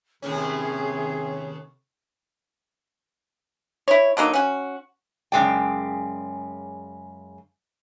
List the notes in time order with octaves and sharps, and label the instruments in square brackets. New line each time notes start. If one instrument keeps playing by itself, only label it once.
[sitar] D#2 A2 C#4 [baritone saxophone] C3 [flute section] G#4
[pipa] E4 C#5
D3 F#3 A#3 D#4
C#4 F#4
[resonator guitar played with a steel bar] F#2 C#3 E3 G#3 D5 G5